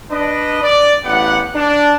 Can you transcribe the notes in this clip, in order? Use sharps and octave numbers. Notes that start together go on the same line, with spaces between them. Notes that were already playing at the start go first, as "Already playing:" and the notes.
D4 B4 D#5
D5
A1 B3 G4 F#5
D4